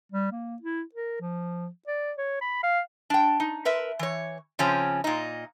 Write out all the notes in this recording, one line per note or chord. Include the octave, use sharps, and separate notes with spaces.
G3
A#3
E4
A#4
F3
D5
C#5
B5
F5
D4 G5
D#4
A#4 B4 E5
E3 C#5
C#3 F3 C4 C#4
A#2 D#4